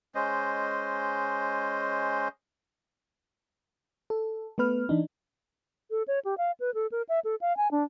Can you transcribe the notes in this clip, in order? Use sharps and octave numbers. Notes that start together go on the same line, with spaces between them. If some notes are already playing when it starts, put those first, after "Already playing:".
G#3 C#4 C5 D#5
A4
A3 B3 B4 F6
E3 D4 D#4
A4
C#5
G4
F5
B4
A4
A#4
E5
A4
F5
G#5
D4